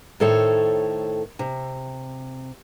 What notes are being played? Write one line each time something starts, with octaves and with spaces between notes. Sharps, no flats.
A2 D#3 A4 C5 C#5 A5
C3